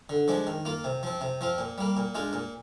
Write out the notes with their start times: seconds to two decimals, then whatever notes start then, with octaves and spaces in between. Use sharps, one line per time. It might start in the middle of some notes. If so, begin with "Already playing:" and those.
0.09 D3
0.28 F3 G#3 D4
0.47 D#3
0.65 A#3 F4
0.84 C3
1.03 F3 C4
1.21 C3
1.41 F3 C4 F4
1.58 A#2
1.78 G3 A#3
1.97 A#2
2.15 G#3 D4 F4
2.33 A#2